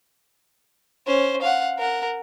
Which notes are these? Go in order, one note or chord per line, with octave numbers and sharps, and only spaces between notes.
C#4 C5
F5 F#5
A#4 F#5